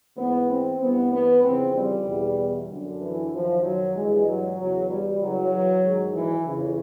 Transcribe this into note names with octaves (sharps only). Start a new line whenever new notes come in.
G#2 E3 B3
C4
G2 E3 B3
B3
F2 C#3 E3 C4
G3
E2 B2
F#2 D3
E3
F#2 D#3 F3
F#3
G2 E3 G#3
F#3
E2 C#3 E3 F#3
G3
F#2 C#3 E3 F#3
G#2 D#3
E3
F2 C#3 E3